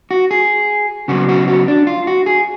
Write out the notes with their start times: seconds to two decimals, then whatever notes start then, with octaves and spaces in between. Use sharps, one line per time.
0.11 F#4
0.31 G#4
1.08 C#3 F#3 B3 F#4
1.29 F#4
1.48 F#4
1.68 D4
1.87 F4
2.07 F#4
2.26 G#4